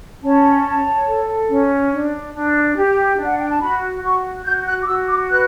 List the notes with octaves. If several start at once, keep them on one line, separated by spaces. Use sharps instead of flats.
C#4 A5
C#5
A4
C#4
D4
D4
G4
D4
F#5
G5
A5
F#4 B5
F#4 C#6
F#4 G6
F#6
D6
F#4 E6
D6
B4 F#6